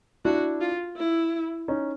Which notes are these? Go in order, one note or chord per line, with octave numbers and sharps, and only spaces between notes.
D4 E4 F#4
F4
E4
C#4 D#4